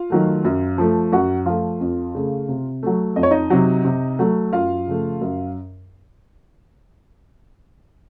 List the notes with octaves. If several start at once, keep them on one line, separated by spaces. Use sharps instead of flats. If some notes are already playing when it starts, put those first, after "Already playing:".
Already playing: F4 F5
D#3 F#3 A3
F#2
F3 A3
F#2 F#4 F#5
F3 A3 F4 F5
F2
C#3 A3
C3
F#3 A3
F2 D#5
C#5
D#4 D#5
C3 F#3
C3
F#3 A3
F#2 F4 F5
C#3 F3 A3
F#2